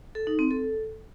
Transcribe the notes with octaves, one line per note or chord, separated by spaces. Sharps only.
A4
D#4
C4
A4